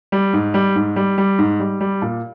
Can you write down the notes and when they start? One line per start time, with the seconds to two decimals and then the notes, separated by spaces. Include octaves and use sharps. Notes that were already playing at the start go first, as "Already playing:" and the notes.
0.12 G3
0.33 G#2
0.54 G3
0.76 G#2
0.96 G3
1.18 G3
1.39 G#2
1.60 G3
1.81 G3
2.02 A#2